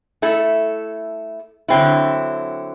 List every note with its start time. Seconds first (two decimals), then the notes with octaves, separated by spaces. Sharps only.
0.22 A3 E4 A4
1.68 D3 F#3 C4 E4